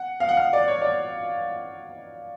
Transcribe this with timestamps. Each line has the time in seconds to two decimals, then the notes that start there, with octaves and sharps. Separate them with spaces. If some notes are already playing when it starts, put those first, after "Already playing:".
Already playing: F#5
0.20 F5
0.29 F#5
0.37 F5
0.53 D5
0.68 C#5
0.82 D5